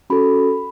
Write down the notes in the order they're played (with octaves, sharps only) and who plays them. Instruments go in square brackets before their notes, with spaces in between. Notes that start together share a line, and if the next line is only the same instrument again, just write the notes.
[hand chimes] C#4 F#4 A4 B5